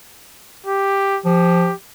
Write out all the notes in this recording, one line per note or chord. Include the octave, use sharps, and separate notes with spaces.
G4
F3 G4